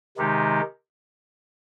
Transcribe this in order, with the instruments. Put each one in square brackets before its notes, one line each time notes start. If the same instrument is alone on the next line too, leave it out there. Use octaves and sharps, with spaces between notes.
[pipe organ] C3 D#3 G#3 D#4 G4